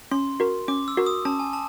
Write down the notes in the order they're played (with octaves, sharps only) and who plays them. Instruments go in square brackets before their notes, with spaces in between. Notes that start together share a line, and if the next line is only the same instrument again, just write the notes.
[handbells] C#4 [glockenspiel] C6
[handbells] F#4 A#4
[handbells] C#4 [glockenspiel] D6
[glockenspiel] E6
[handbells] F#4 A#4
[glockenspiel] D#6
[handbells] C#4 [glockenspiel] A5
[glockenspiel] G#5
A5